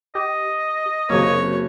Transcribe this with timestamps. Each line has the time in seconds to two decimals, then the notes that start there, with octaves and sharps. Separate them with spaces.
0.15 G4 D#5
1.10 F#1 C3 F#3 A#3 C#5